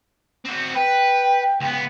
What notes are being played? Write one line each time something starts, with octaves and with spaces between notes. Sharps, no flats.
C4 F#4
B4 G5
C#2 B3